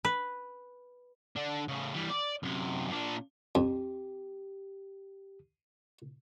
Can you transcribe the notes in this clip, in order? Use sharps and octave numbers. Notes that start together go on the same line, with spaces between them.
B4
D3 D4
A2 C#3
E3 G3
D5
F#2 C3
A#2 D4
F2 G4